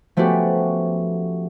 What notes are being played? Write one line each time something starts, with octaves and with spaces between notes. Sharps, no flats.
F3 A3 B3 C#4 F#4 G4